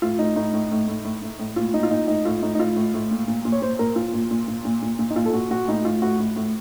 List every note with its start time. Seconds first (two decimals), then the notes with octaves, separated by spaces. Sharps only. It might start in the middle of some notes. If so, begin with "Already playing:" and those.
0.02 A2 F4
0.19 A2 D#4
0.36 A2 D#4
0.53 A2
0.71 A2
0.88 A2
1.05 A2
1.22 A2
1.39 A2
1.56 A#2 F4
1.74 A#2 D#4
1.83 F4
1.90 A#2 D#4
2.08 A2 D#4
2.25 A2 F4
2.42 A2 D#4
2.55 D#4
2.59 A2 F4
2.76 A2
2.94 A2
3.11 A#2
3.28 A#2
3.45 A#2
3.52 C#5
3.62 A#2 C5
3.79 A#2 A#4
3.96 A#2 F4
4.13 A#2
4.31 A#2
4.48 A#2
4.65 A#2
4.82 A#2
4.99 A#2
5.10 D#4
5.16 A#2 F4
5.25 A4
5.33 A#2 F#4
5.50 A#2 F#4
5.68 A2 D#4
5.85 A2 F4
6.02 A2 F#4
6.19 A2
6.36 A2